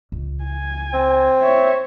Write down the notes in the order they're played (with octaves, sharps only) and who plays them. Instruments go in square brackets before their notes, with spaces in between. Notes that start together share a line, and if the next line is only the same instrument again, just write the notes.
[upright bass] C#2
[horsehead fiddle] G#5
[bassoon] C4
[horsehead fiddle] C#5 E5